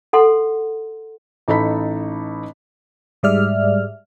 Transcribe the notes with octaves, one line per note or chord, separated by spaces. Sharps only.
A4 F#5 C6
A1 D#4 A4 A5 B5 B6
G#2 G3 G#3 D5 E5 F6